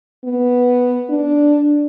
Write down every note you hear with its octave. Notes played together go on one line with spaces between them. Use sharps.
B3
D4